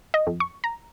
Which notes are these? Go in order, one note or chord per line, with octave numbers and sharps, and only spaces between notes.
D#5
F2
C#6
A#5